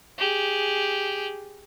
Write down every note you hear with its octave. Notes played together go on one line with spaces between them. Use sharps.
G4 G#4